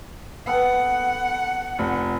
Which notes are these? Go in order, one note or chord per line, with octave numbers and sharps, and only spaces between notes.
B3 A4 F#5 G5
F1